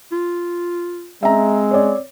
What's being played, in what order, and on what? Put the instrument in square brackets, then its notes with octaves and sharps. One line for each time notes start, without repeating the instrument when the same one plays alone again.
[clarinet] F4
[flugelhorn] G#3 [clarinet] C4 [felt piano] E5 A#5
[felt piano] C#5 D5